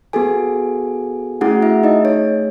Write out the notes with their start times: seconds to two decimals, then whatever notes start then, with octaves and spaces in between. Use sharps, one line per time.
0.13 B3 F#4 G#4 A4 G#5
1.41 A3 C#4 E4 F#4 G#4 F#5
1.62 E4 E5
1.83 D#4 D#5
2.05 C#5